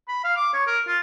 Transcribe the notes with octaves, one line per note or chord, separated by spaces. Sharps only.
B5
F5
D6
C#5
A#4
F4